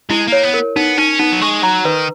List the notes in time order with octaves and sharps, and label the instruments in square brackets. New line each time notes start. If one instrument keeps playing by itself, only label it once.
[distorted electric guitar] G#3 [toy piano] E4
[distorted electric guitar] A#3
[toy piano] C#5
[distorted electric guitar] B3
[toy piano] A#4
[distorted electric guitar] B3 [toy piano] D#4
[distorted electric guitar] C#4 [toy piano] D#4
[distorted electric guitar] B3 [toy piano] D#4
[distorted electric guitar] F#3
[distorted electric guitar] G#3 [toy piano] C#6
[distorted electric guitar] F#3 [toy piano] A#5
[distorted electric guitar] D#3 [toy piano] B4